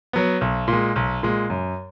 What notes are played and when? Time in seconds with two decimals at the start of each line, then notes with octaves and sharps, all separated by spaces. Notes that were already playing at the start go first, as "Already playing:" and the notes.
0.13 F#3 B3
0.41 B1
0.68 A#2
0.73 G#3
0.96 B1
1.23 A#2 G#3
1.50 F#2